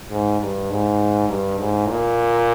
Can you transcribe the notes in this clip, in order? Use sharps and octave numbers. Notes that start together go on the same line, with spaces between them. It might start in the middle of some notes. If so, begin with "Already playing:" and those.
G#2
G2
G#2
G2
G#2
A#2